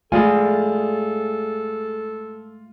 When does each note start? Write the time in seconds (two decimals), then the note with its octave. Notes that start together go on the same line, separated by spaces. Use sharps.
0.12 G#3 A3 F4 G#4 A4 D5 G#5